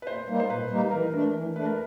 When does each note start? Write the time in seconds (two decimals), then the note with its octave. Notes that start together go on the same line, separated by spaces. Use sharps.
0.02 B4
0.07 A#2 C5
0.28 G3 A#3 D#4
0.40 C5
0.50 A#2 B4
0.70 G3 A#3 D#4
0.91 E3 A#4
1.02 B4
1.12 A3 D4 A#4
1.34 E3
1.55 A3 D4 B4
1.66 A#4